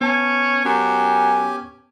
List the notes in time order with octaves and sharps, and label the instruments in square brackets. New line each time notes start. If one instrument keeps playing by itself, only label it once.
[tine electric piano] B3 A5 [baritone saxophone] C#4
[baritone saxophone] F#2 [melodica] C#4 G4 G#5